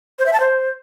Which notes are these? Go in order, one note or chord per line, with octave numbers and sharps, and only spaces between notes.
C5
E5
A5
C5